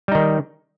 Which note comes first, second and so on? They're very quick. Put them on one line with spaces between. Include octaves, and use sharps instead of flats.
G3 D#4 D#3